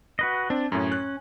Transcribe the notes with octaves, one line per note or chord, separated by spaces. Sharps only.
F#4 B4 D#5
C4 D4
F#2 A2 C#4
F#6